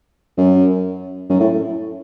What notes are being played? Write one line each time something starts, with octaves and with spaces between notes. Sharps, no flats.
F#2
F#2
A2